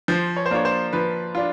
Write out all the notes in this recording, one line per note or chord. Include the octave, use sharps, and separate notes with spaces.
F3 C5
C#5
C5
A#3 D4 F4 C#5
C5
F3 B4
D4 F4